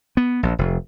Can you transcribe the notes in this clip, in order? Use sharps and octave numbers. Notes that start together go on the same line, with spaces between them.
B3
A#1
F1